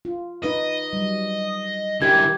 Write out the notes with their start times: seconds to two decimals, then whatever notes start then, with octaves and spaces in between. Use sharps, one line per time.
0.05 F4
0.44 D#4 B4 D#5
0.93 F#3 G3
2.02 D3 E3 G4 A#4 G#6